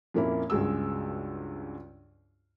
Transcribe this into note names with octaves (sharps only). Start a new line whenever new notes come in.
F2 A#2 A#3 C#4 E4
C#2 G2 G#3 F#4 E6